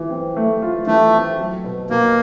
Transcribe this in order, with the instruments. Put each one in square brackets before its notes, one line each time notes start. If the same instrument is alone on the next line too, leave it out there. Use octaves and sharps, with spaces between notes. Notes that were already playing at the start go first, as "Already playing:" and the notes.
Already playing: [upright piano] E3 F4
C4
A3
F4
[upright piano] E3 [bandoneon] A3
[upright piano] C4
F#3
B2
[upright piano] B2 [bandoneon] A#3